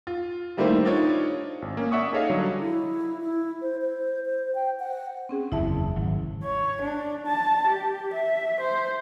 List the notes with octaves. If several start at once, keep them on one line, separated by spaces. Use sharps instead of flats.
F4
D#3 G3 A3 A#3 E4 C5
D4 D#4 F4 C#5
G#1
A#3 C#4
D5 E5 F#5 C#6 D#6
D#4 G#4 A4 C#5 D#5 F5
D3 F#3 G3
E4
E4
C5
C5
C5
G5
F#5
C4 C#4 G#4
F#1 E2 E4 E5 A5
G#1 F#3
C#5
D4
A5
G4
E5
C5